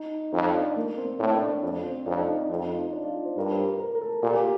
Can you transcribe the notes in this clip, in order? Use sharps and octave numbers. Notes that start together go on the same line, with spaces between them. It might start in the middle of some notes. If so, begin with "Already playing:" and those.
Already playing: D#4
F2 D#4
D4
A#3
C4
A2 D4
D4
C4
D4
F2 D4
C4
F2 D4
D#4
D4
F2 D#4
D#4
F4
D4
F4
C5
G2 A#4
C5
A#4
A#4
A4
A#2 G4
G4